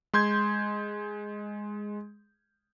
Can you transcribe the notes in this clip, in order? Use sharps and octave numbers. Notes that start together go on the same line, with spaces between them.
G#3 C6 G6 G#6